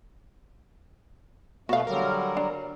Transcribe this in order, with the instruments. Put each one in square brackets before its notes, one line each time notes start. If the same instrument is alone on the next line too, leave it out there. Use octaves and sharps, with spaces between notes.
[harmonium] B2 A3 [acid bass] B3 [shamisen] F#4 F5
[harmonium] D3 F#3 G3 [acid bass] A#4
[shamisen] D4